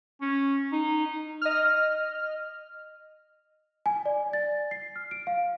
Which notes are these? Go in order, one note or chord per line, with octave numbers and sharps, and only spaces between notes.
C#4
D#4
D#5 F6
G#5
D5
A6
C7
F6
D7
F5